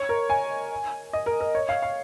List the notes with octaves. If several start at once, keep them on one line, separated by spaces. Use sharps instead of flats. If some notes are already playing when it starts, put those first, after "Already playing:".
Already playing: C#5
A#4
G#5
D#5
A#4
A#4
C#5
F5
F5